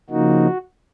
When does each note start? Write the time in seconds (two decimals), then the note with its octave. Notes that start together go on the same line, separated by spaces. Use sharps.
0.10 C#3 F3 A#3 D#4 F#4